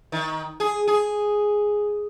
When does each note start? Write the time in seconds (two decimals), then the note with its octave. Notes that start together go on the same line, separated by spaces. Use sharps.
0.12 D#3
0.60 G#4
0.88 G#4